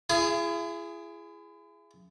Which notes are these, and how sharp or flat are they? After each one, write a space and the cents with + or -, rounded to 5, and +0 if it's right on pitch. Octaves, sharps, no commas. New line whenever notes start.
E4 +40 G#4 +0 D#6 -10